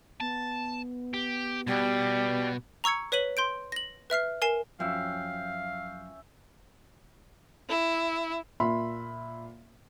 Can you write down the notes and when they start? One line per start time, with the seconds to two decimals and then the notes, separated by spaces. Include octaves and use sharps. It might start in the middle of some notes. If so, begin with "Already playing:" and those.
0.20 B3 A5
1.14 G4
1.67 B2 G3
2.84 A#5 C#6 E6 G#6 C#7
3.12 B4 C#5 B6 D#7 F#7
3.37 C6 G6 D7
3.72 A#6 F#7
4.10 B4 E5 F6 C7
4.42 A#4 G#5 C7 E7
4.80 F#2 F3 C#4 E5 F5 G5
7.70 E4
8.60 A#2 E5 B5 C6